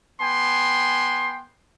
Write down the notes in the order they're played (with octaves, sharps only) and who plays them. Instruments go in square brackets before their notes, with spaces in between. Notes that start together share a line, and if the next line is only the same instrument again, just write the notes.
[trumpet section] B3 G5 G#5 C6